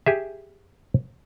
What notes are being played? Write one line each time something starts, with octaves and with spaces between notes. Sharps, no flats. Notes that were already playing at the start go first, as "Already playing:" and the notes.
G4 G#4 E5